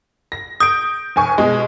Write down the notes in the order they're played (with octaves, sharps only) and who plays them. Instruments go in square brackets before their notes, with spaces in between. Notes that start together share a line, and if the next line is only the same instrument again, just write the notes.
[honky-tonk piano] A#6
[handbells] D#6 [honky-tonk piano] G6 D7
[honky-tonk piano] F1 G#5 C#6
B2 G#3